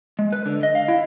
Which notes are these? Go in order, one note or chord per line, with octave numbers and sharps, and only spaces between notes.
G#3
B4
D3
D#5
F5
E4